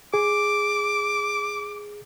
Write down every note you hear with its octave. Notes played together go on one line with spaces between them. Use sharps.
G#4 D6